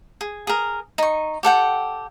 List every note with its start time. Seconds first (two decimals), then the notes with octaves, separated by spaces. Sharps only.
0.21 G#4
0.47 G#4 A#4
0.98 D#4 C#6
1.43 G4 A4 F#5 G5